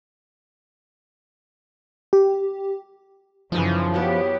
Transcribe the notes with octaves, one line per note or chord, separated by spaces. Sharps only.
G4
F#2 C#3 E3 F3 D#4 G#4 G#5
F#3 B3 E4 G4 C#5